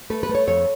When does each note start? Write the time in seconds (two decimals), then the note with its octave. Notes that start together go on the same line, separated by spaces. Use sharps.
0.10 A3 B4
0.23 B4
0.29 A3
0.35 C#5
0.47 F2 C#5